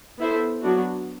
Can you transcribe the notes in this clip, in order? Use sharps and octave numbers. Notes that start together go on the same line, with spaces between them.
B3 E4 A4 C5 E5
F#3 B3 D4 F#4